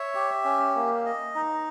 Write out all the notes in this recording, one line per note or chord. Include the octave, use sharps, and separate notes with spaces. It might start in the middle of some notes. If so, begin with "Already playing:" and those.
Already playing: C#5 E5
G4
C#4
A#3
D#5
D#4